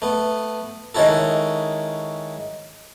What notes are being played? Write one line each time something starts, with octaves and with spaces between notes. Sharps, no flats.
A3 B3
D#3 G#3 C#4 E4 F#4 A4